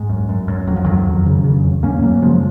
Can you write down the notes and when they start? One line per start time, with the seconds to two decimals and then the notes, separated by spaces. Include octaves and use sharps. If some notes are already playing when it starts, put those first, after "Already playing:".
Already playing: G#2
0.09 F#2
0.29 F#2
0.48 F#2
0.67 F2 F#3
0.76 F3
0.85 F2 D#3 F#3
1.07 F2
1.26 C#3
1.44 C#3
1.64 F2
1.83 F#2 A#3 C#4
2.02 F#2 F#3 A#3
2.22 C#3 F3 G#3